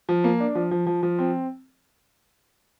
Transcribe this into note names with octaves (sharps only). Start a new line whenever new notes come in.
F3
A#3
D4
F3
F3
F3
F3
C4